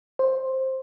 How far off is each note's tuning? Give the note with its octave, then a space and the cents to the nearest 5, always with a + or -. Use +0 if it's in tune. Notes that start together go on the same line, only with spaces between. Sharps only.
C5 +10